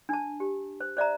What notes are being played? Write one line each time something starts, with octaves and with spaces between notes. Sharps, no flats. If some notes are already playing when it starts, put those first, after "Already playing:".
D4 A5
G4
C5
C5 D5 E5 A#5